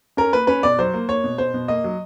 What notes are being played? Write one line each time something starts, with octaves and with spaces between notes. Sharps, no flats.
C#4 A#4
A#3 B4
C#4 B4
B2 D5
F#3 C5
A#3
A#3 C#5
B2
B2 C5
B2
A#3 D#5
F#3